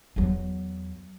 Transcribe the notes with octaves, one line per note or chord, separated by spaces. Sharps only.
E2 F#3